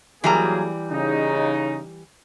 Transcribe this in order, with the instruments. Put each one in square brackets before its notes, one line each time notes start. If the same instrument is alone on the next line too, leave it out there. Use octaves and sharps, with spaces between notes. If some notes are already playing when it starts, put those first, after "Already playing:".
[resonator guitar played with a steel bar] E3 G3 A#5 [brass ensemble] F#3 A#3 G#4
[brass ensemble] C#3 D#4